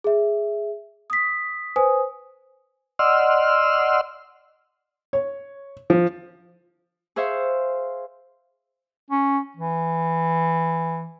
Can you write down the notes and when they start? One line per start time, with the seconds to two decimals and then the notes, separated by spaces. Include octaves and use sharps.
0.04 G#4 E5
1.10 D#6 B6
1.76 B4 C5 G#5 D#6
2.99 D5 D#5 F#5 C6 E6 F6
5.13 C#5
5.90 F3
7.16 G#4 C5 E5 F5 C#6
9.10 C#4
9.57 E3